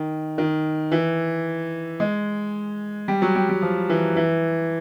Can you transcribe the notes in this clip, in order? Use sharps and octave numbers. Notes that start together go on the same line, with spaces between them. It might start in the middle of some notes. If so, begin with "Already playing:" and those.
Already playing: D#3
D#3
E3
G#3
G3
F#3
G3
G3
F3
E3
E3